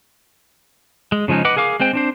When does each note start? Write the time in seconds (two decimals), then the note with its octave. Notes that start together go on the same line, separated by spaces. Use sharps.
1.12 G#3
1.28 C#3 F3 G#3 C#4 D#4
1.45 B4 D#5 F#5 D6
1.57 G#4 A#4 F5 D6
1.80 G#3 C4 C5 G5
1.93 C4 D4 C5